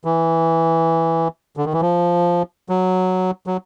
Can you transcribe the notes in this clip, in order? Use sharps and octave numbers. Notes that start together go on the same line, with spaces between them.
E3
D3
D#3
E3
F3
F#3
F#3